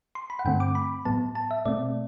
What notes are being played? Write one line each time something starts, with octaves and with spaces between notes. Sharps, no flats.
C6
B5
F#5
G2 D3 A3 C4 G5
D6
B5
A2 F#3 B3 A5
A5
E5
B2 A3 C4 D5